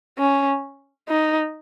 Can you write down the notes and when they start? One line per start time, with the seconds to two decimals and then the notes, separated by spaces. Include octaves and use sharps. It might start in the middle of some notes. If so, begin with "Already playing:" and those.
0.18 C#4
1.09 D#4